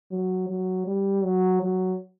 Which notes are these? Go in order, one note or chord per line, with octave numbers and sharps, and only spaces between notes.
F#3
F#3
G3
F#3
F#3